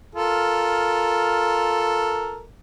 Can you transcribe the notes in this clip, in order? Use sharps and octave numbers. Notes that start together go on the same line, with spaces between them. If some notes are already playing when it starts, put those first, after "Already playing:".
F4 A4 A#4